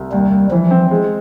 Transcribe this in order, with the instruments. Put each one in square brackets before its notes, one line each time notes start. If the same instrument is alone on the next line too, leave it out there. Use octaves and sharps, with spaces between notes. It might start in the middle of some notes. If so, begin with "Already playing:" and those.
Already playing: [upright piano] C2
[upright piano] D#2 [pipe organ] G3
[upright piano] D#2
[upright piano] E3 [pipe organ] F3
[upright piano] C4
G#3